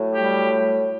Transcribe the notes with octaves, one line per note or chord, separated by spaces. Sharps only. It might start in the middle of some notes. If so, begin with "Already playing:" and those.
Already playing: A2 F#3 A3
G3 G4